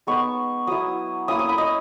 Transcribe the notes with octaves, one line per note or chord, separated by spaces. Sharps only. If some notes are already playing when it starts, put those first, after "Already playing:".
G#3 B3 D#4 C#6
F#3 B3 E4 D#6
A#3 C#4 E4 D#6
D#6
B5
D#5